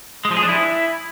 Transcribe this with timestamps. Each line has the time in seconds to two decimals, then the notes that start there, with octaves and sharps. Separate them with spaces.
0.25 G#3
0.31 F3
0.37 G#4
0.43 D4
0.49 E4